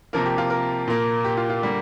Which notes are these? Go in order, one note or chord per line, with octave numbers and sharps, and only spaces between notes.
C3 F3 A#3 A#4
G4
F4
A#4
A#2 A#3
G4
F4
F4
D3 G3 A#3